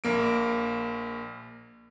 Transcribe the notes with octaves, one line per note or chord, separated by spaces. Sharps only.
A#1 A#3 D7